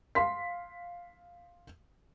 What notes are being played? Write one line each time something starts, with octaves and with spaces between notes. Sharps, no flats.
F5 C6 B6